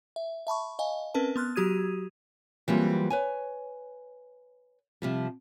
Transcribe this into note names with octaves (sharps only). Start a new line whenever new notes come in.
E5
E5 A5 B5 C#6
D#5 F5 G#5
C4 C#4 A#4 B4 A5
B3 C6 F6 F#6
F#3 F#4 G4 D#6 G#6 D#7
E3 F#3 G3 A#3 C4 F4
B4 C#5 G#5
C3 F3 G3